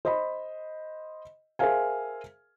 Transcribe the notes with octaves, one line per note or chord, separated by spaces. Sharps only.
C5 D#5 B5
G#4 A#4 C5 E5 F5 G#5